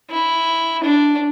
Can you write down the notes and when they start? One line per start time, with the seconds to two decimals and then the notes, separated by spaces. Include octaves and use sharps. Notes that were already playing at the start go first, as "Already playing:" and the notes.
0.10 E4
0.83 D4